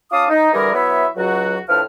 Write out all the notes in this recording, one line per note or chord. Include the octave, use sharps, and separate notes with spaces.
C#4 F4 F5 A5 D6 D#6
D#4
D3 E3 G3 G4 G#4 A#4
F#3 B3 E4 C#5 E5
C#2 F#3 F#4
A2 F3 D4 B4 F6